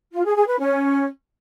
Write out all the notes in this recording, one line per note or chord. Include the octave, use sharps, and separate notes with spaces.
F4
G#4
G#4
B4
C#4